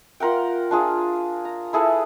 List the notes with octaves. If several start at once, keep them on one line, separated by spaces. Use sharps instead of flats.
F4 A#4 F#5 G5
D4 F4 G#4
A#5
E4 G#4 A4 B4